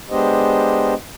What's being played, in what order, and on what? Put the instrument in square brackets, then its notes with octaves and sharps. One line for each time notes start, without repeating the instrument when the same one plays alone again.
[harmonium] G#3 B3 D4 G4 C5 D#5